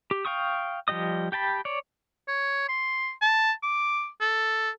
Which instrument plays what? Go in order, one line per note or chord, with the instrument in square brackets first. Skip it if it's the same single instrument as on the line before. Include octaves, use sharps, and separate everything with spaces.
[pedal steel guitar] G4
F5 G5 C#6 D#6
F3 G3 G4 D#5 D#6
G4 G5 A5 B5
C#5 D5
[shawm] C#5
C6
A5
D6
A4